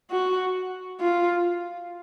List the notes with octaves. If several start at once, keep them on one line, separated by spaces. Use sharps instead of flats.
F#4
F4